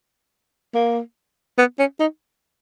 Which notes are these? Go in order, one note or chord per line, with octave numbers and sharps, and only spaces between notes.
A#3
B3
C#4
D#4